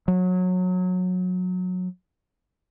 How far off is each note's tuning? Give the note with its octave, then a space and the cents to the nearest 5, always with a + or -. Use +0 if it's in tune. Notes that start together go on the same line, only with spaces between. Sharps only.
F#3 -20